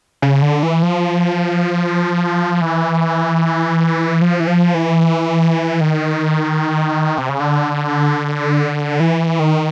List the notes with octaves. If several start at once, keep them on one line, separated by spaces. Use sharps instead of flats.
C#3
D3
E3
F3
E3
F3
E3
F3
E3
D#3
C3
C#3
D3
E3
D#3